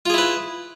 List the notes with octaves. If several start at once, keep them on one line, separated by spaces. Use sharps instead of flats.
E4 F4 G#4 B4